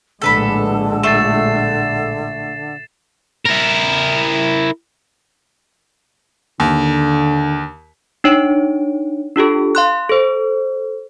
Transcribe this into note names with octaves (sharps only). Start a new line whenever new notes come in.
A#1 A2 D3 G#3 A4 B4 B5
A3 A6 C7 E7
E4 A#4
D#2 D3
D4 D#4 C#5 D7
D4 F4 G4 A4
F5 C6 F#6
A4 C5